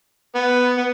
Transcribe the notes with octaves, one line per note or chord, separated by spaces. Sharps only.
B3
B3